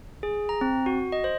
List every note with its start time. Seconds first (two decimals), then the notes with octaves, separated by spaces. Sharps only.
0.23 G#4
0.49 A#5
0.61 C4
0.86 F#4
1.12 D#5
1.24 C5